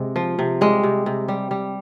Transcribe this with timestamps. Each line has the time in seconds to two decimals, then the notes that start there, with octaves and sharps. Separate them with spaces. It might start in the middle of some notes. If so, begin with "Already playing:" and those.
Already playing: C3 G#3
0.16 F3
0.39 C3
0.61 G3 G#3
0.83 C3
1.06 C3
1.28 G3
1.51 G3